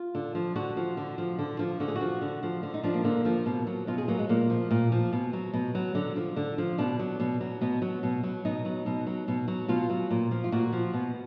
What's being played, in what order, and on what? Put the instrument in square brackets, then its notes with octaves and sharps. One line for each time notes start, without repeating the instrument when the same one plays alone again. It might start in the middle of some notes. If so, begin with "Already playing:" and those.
Already playing: [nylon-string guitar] F4
D3
F3
D3 F#4
F3
D3
F3
D3
F3
D3 F#4
G#4
F#4
F3
D3
F3
D3
D#4
F3 D4
A#3
D3 A#3
F3
B2
F#3
B2 F4
G#4
F#3 A#3
G#3
A#2 A#3
F3
A#2
F3
B2
F#3
B2
F#3
D3
F3
D3
F3
B2 D4
F#3
B2
F#3
B2 B3
F#3
B2
F#3
B2 D#4
F#3
B2
F#3
B2
F#3
B2 F4
F#3
A#2
F3
F4
A#2 F#4
F3
B2